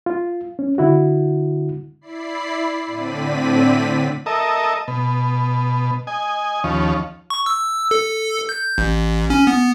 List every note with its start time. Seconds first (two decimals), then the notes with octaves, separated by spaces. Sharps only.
0.06 F4
0.59 C#4
0.78 D3 E4 F#4
2.01 E4 D5 B5 C7
2.86 A2 D3 C4 D5 B6 D#7
4.26 A4 A#4 D#5 E5
4.88 B2
6.07 D#5 G#5
6.64 D#2 F3 C#4
7.30 C#6
7.46 E6
7.91 A4
8.49 G6
8.78 A1
9.30 C#4
9.47 B3